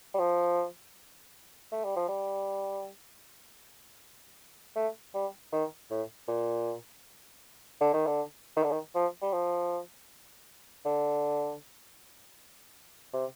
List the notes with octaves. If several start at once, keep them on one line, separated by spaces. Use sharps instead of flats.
G3
F3
A3
G3
F3
G3
A3
G3
D#3
A2
A#2
D3
D#3
D3
D#3
D3
D#3
F3
G3
F3
D3
C3